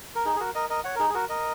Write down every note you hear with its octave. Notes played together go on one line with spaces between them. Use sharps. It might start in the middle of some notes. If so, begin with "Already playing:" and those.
A#4
D#4 G#4
G#4
F#4 A#4
A#4 D#5
A#4 D#5
C#5 F#5
A#4
D#4 G#4
G#4
F#4 A#4
A#4 D#5